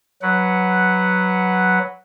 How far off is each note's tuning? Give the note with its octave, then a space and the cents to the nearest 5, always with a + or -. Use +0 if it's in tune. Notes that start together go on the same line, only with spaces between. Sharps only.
F#3 +0 B4 +0 F#5 +0